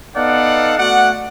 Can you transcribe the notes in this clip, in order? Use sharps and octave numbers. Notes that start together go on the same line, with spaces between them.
B3 D#4 A4 D5 F5 F#5
A3 F#4 D5 F#5